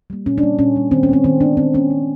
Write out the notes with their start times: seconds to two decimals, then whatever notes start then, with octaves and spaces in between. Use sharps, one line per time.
0.10 G3 A#3
0.26 A#2 C#4
0.38 D4
0.43 G3 A#3
0.59 A#2 C#4
0.76 G3 A#3
0.91 D#3 C4
1.03 C#4
1.09 G#3 B3 C4
1.24 D#3 C4
1.41 G#3 B3 D4
1.57 D#3 C4
1.74 G#3 B3 C#4
1.90 D#3